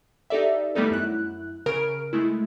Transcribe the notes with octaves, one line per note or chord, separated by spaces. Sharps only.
D#4 G4 A4 D5 E5
D#3 G3 A3 B3 D#4 A4
F#2 E4 F#6
C#3 A#4 F6 D7
G#3 A3 E4